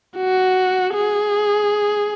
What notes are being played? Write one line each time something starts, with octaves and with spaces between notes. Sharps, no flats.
F#4
G#4